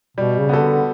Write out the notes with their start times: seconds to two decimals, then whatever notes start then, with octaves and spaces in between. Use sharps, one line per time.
0.17 B2 G3
0.39 C#3
0.49 B3 F#4 A4
0.60 D3